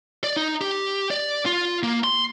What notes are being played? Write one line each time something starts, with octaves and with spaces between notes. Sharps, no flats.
D5
D#4
G4
D5
F4
A#3
C6